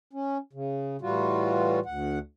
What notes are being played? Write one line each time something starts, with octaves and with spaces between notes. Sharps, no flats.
C#4
C#3
A2 E3 G3 F4 F#4
D2 F#5